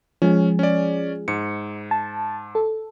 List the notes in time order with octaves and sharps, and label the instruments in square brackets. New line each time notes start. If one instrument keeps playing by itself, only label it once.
[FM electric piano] F3 G#3 G#4 [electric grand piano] C#4
[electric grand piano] C#4 D5
G#2 C#7
[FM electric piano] A5
A4